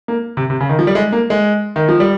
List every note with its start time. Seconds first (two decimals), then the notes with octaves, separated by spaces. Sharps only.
0.08 A#3
0.37 C3
0.50 C3
0.61 C#3
0.69 D#3
0.79 F3
0.87 G3
0.95 G#3
1.12 A#3
1.30 G#3
1.76 D#3
1.89 F3
2.00 G3